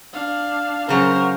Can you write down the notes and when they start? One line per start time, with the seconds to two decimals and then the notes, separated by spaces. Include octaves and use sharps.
0.14 D4 F5
0.89 C#3 F#3 A#4 C5